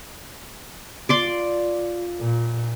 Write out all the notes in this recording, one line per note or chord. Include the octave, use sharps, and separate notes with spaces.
F4 D5 C6 D6
A#2